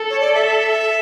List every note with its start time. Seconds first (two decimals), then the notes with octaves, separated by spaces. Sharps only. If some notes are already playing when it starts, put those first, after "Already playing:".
Already playing: A4
0.10 C#5
0.20 D5
0.34 E5